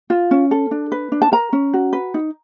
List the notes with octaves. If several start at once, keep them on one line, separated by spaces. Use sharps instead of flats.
F4
C#4
A4
D4
B4
D4
A5
A#4 A#5
C#4
F#4
B4
D#4